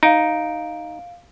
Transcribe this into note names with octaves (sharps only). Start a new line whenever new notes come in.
D#4 F5 D7